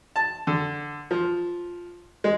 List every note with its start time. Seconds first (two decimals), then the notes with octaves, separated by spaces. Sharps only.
0.16 A5
0.47 D3
1.11 F3
2.24 G#3